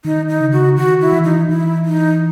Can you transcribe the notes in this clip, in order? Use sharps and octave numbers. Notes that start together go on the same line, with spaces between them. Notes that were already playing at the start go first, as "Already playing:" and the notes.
D#3 D#4
D#4
C#3
F#4
D#3 F#4
E4
E3
D#4
E3 E4
D#4